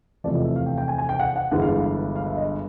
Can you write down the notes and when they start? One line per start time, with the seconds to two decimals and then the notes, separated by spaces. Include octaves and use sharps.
0.24 E2 C3 F3 A3 D5
0.34 D#5
0.45 E5
0.56 F5
0.66 G5
0.78 G5
0.88 G#5
0.98 G#5
1.09 G5
1.20 F#5
1.36 F#5
1.51 G1 G2 E3 G#3 F#5
1.62 F5
2.16 F5
2.27 E5
2.37 D#5